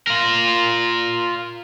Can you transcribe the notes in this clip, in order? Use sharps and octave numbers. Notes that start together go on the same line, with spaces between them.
F4 A#4